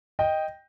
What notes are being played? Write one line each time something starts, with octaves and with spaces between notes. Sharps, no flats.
D#5 G5